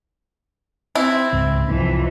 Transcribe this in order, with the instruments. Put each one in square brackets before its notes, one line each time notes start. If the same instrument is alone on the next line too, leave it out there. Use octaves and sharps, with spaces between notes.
[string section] C4 [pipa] E4
[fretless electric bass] C#2 G#2
[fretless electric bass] C2 [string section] F2 E3